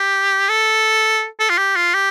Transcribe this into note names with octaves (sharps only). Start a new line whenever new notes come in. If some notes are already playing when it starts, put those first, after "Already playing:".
Already playing: G4
A4
A4
F4
G4
F4
G4